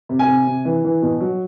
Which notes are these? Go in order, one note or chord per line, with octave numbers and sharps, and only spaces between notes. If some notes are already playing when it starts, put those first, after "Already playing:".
C3
G#5
C3
C3
E3
E3
B2
F#3